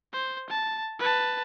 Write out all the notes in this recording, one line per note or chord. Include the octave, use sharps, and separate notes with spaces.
C5
A5
B4 A5